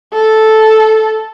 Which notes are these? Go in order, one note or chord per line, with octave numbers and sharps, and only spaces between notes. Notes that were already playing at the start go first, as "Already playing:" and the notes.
A4